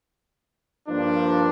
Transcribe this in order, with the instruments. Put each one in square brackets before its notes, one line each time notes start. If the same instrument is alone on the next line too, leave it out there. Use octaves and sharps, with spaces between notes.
[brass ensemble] G2 F3 A#3 D4